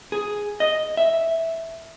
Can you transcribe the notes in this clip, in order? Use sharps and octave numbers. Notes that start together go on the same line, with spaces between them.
G#4
D#5
E5